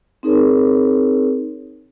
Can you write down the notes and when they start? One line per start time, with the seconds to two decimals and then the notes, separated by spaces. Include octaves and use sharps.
0.23 C4 D#4 G#4 A#4 C#5